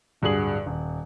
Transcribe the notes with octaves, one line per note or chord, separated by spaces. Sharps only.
D1 G2 F#4 G#4 F#7
D#1